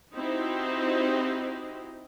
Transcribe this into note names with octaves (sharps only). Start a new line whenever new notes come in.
C4 D#4 E4 F#4 G4 C5